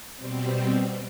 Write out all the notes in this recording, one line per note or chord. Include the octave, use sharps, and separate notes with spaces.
B2 G3 C4